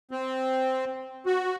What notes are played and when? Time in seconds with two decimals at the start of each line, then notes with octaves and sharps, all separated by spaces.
0.11 C4
1.26 F#4